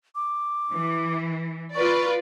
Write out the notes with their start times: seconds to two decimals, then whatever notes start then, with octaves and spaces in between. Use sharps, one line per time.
0.15 D6
0.71 E3
1.75 F4 B4 D5 C#6